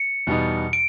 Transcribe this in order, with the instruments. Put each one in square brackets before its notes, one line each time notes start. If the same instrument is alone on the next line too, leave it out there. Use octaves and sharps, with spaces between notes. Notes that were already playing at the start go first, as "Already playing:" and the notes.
Already playing: [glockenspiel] C#7
[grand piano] E2 B2 G3 B3 D#4
[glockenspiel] D7